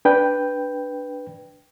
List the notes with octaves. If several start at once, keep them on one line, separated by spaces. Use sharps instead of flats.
D4 B4 G5